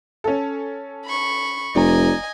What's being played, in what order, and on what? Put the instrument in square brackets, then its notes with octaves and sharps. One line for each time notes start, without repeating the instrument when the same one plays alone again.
[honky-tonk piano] C#4 A4
[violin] B5 C#6
[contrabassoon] F1 [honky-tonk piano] D5 A#5 [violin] D#5 G#5